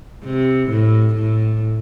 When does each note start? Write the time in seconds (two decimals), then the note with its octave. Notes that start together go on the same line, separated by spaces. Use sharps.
0.25 C3
0.70 A2
1.14 A2